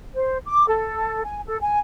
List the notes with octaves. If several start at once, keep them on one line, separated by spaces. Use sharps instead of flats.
C5
D6
A4
G#5
A4
G#5